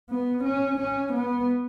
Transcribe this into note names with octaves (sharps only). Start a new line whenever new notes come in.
B3
C#4
C#4
B3